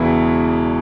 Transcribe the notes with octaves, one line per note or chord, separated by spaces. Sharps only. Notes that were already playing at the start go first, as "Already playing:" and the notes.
Already playing: E1 E2 C#3 E3 B3 E4